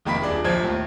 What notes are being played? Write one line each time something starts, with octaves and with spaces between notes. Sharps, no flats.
F1 D#3 A#3 B5 B6
D#1 D4 G#4
D#1 A#1 F3 C5 G#6
D#2 A2